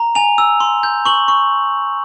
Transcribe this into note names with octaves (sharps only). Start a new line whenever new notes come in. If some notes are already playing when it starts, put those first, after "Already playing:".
Already playing: A#5
G#5 F7
E6
C6
G6
C#6 F#7
C#6